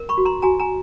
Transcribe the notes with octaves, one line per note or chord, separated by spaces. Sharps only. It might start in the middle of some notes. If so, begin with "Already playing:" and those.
Already playing: A#4
B5 C#6
F#4
A#5 C6
F#4 G#5 A#5
G#5 A#5